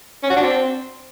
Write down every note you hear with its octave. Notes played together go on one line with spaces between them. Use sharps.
C#4
F#4
D4
C4